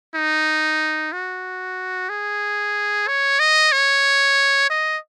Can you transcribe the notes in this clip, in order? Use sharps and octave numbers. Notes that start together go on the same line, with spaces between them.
D#4
F#4
G#4
C#5
D#5
C#5
D#5